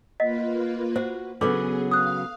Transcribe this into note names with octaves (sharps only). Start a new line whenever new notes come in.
A#3 F4 B4 D#5 F#5 B6
F#4 C5 F#5
C#3 F#3 B3 D4 G#4 A4 B4 D6
F5 D#6 F#6